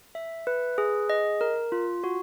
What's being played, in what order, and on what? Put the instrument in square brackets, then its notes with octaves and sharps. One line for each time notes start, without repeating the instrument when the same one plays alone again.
[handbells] E5
B4
G#4
D#5
A#4
F4
F#4